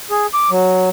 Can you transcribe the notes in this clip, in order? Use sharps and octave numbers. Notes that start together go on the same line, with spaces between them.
G#4
D6
F#3